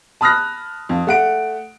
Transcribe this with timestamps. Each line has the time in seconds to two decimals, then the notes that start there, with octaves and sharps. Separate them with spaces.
0.21 A5 B5 D#6 F6 F#6 A#6
0.89 F2
1.07 A3 F#5 D7